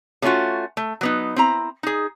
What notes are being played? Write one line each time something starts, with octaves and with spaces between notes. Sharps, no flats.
C3 A3 C#4 F4 F#4
A3
F#3 B3 D#4
C4 E4 A#5
D#4 G#4